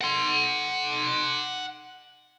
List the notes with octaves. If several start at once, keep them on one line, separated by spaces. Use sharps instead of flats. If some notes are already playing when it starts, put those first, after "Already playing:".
F#5 C6